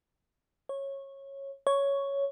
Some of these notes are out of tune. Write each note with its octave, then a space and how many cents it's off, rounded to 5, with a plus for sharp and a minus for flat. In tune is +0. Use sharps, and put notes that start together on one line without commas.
C#5 -15
C#5 +5